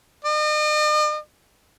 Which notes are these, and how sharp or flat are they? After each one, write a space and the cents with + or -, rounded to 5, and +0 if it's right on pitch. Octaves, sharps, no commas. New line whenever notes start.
D#5 -45